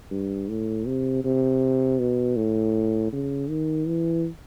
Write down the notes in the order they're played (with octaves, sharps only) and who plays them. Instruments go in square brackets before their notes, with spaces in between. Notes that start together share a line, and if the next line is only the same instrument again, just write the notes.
[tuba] G2
A2
C3
C3
B2
A2
C#3
D#3
E3